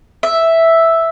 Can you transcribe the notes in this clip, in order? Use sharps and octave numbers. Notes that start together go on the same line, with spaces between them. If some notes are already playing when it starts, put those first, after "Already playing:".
E5